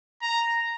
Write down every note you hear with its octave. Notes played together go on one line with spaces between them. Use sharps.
A#5